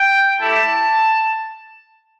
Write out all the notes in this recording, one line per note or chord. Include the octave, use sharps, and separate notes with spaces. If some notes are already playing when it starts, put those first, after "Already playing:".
Already playing: G5
A3 E4 G4 A5